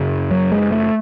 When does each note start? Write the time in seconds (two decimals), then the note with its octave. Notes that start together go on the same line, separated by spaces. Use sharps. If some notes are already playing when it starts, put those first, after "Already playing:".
Already playing: F#2 C#3
0.31 F#3
0.52 G#3
0.72 A3